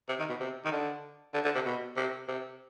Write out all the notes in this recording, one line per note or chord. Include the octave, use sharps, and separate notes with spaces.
C3
D#3
B2
C3
D#3
D3
D3
D3
C3
B2
C3
C3